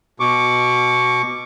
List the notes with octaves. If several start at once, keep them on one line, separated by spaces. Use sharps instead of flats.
B2 C#6 D6